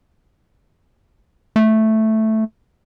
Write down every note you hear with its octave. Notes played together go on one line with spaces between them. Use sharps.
A3